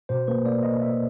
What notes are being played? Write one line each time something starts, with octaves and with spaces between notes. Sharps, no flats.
B2 C5
A#3 B4
A#3 D5
A#3 D#5
A#3 E5